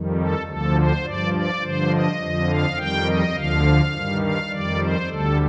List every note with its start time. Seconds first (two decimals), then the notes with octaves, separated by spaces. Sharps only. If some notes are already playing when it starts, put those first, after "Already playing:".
Already playing: F2 D#3 G3
0.18 A4
0.46 D2 D3 F3 A4
0.76 C5
1.04 G2 F3 D5
1.33 D5
1.62 G2 D3 F3 C5
1.91 D#5
2.19 F2 D3 F3
2.48 F5
2.77 F2 D#3 G3 G5
3.06 D#5
3.35 D2 D3 F3 F5
3.93 G2 D#3 G3
4.21 F5
4.50 F2 D#3 G3 D5
4.79 C5
5.08 D2 D3 G3 A4